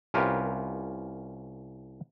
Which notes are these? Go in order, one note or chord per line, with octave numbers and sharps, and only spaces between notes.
C2 C#4 F4 G4 A#4 B4